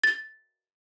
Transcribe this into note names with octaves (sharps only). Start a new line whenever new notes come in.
A6